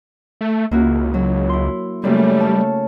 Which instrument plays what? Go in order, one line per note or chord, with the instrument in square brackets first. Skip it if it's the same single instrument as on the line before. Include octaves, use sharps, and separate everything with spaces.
[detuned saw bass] A3
[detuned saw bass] C#2 [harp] A#3 E4 F#4
[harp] F#3
E4 C6
[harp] F#2 C#3 A#3 [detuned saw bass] G3 [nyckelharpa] A3
[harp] C#5 F5 A5